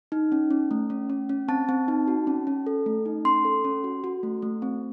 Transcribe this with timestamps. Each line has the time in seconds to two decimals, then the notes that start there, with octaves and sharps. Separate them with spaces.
0.12 D#4
0.32 C#4
0.51 C#4
0.71 A3
0.90 C#4
1.10 C#4
1.29 C#4
1.48 C4 A5
1.69 C4
1.88 D#4
2.08 F#4
2.27 C#4
2.47 C#4
2.67 A4
2.86 A3
3.06 D#4
3.25 C#4 C6
3.45 A4
3.64 C#4
3.84 F#4
4.04 F#4
4.23 A3
4.42 A3
4.62 C4